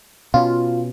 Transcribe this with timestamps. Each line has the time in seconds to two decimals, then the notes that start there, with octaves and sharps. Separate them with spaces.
0.34 B2 C#4 F4